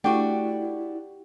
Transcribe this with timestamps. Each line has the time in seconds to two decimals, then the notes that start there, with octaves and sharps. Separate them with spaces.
0.04 A3 D4 E4 F#4 G4 G5